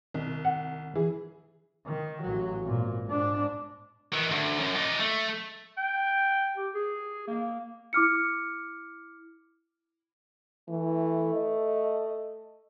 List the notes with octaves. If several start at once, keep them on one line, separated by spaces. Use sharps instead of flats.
C2 D#3
F#5
E3 G#4
D#3
A1 F#3
G#1 A#2
G#2 D4
D#3 E3
D2
F#2
D#4 D5
A3
G5
G4
G#4
A#3
E4 D6 F6 C#7
E3 A3
D#5